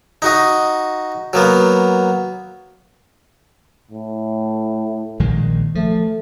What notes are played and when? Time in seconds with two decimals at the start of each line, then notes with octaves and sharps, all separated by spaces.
0.22 D#4 F#4 D#5
1.33 F#3 A#3 B3
3.91 A2
5.20 A#1 D#3 G#3
5.75 F3 A3